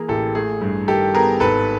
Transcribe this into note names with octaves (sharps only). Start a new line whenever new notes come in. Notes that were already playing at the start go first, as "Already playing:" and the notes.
Already playing: E3 A#3 G#4 A#4
A1 G4 A4
A3 G#4
G2
D#3 G4 A4
B3 G#4 A#4
G#1 A4 B4